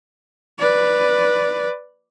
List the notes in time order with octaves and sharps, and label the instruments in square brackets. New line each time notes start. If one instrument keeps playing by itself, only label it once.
[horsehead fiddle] B4 D5